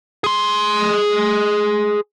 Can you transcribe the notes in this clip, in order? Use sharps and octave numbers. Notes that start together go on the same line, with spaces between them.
G#4 C6